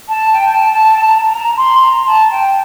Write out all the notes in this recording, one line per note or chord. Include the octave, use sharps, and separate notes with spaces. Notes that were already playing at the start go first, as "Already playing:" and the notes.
A5
G5
A5
A5
A5
A#5
A#5
C6
A#5
A5
G5